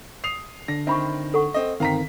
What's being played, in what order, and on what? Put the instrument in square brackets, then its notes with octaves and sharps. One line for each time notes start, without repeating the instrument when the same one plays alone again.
[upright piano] D#6 C7 F7
[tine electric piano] D3 D4 [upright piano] A#6
[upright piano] D#3 C4 [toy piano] E5 B5 C#6
[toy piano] A4 F#5 C#6
[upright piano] C4 D#5
[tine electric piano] G1 D#3 C4 [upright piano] F5 A#5 B6